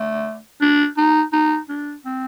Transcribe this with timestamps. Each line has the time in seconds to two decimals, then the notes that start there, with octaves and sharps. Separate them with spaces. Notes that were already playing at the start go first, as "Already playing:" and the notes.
Already playing: A3
0.61 D4
0.97 D#4
1.33 D#4
1.69 D4
2.05 C4